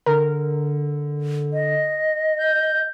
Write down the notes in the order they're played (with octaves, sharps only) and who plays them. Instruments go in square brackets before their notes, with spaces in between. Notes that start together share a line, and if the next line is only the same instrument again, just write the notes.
[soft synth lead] D3 [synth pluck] A#4
[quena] D#5
[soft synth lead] G6